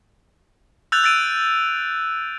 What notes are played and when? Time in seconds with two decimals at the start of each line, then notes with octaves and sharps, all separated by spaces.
0.92 E6 F#6 G6 A6 F7
1.04 E6 A6 D7 D#7